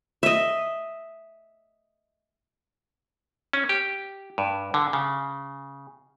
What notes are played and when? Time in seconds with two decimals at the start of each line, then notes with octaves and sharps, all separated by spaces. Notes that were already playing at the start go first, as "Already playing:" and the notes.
0.23 D#5 E5
3.53 C#4
3.69 G4
4.38 G2
4.74 D3
4.93 C#3